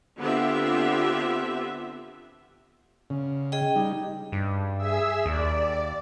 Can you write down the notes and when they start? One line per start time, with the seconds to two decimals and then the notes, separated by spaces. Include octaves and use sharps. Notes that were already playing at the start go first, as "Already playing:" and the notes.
0.18 D3 B3 C4 F4 G4 E5
3.10 C#3
3.52 G#4 D#5 G5
3.76 G3 D#4
4.32 G2
4.77 G#4 E5 E6
5.26 D#2 D5